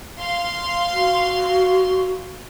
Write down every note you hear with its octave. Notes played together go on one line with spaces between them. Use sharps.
F5 C6
F#4